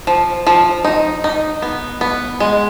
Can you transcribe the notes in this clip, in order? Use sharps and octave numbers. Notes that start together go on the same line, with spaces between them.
F3
F3
D#4
D#4
B3
B3
G#3